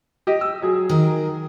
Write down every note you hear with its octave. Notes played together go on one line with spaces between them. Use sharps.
G4 D#5
E6
F#3 G#4
D#3 A#4